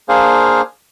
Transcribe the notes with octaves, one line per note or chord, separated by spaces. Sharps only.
A#3 D4 G#4 C5 F5